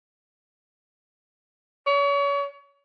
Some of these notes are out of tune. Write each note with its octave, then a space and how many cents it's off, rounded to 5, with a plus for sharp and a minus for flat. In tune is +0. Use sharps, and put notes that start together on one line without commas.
C#5 +35